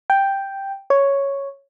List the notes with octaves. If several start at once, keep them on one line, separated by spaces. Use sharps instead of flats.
G5
C#5